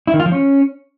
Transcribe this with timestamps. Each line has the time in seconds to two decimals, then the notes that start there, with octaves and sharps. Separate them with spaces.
0.07 E4
0.14 D#3
0.20 F4
0.26 F3
0.32 C#4